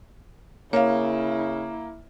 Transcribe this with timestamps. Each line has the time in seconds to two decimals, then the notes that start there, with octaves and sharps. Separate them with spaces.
0.73 C#3 A#3 E4 C#5 F5